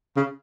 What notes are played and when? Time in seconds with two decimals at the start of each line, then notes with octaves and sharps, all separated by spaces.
0.16 C#3